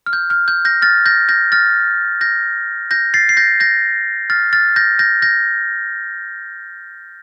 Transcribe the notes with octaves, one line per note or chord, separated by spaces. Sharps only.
F6
G6
F6
G6
G6 A#6
F6 A6
G6 A#6
G6 A#6
F6 A6
G6 A#6
G6 A#6
A6 C7
C7
G6 A#6
G6 A#6
F6 A6
F6 A6
G6 A#6
G6 A#6
G6 A#6